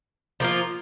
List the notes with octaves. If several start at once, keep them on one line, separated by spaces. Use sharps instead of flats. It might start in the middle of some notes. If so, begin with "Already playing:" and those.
F3 A#3 F4